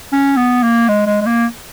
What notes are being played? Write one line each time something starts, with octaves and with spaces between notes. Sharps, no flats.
C#4
B3
A#3
G#3
G#3
G#3
A#3